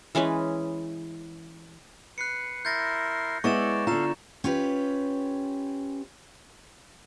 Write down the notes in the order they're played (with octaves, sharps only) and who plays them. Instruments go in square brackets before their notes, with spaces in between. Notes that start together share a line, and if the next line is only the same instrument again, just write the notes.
[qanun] E3 G#3 C#4 B4
[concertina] B4 [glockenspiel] F#6 C7 C#7
[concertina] E4 A#4 C6 [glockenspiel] G6 A6 A#6
[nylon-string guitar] G#3 B3 E4 [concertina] C#5 D5 [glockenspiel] C#6 A6 E7
[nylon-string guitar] D3 F4 [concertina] A4 F5 [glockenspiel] A#5 E7
[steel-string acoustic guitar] C#4 F4 G4 B4